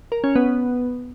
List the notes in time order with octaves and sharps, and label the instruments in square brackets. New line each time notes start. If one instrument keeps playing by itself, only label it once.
[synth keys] A#4
C#4
B3